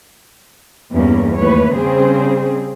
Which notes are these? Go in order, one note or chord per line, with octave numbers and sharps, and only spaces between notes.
E2 G2 G3 A#3 C#4
D#2 E3 A3 B4 C#5
C#3 G3 C4 C#4 G#4 C5